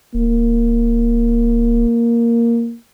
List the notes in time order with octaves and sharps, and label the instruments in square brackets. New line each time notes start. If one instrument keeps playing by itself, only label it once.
[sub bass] D1 [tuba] A#3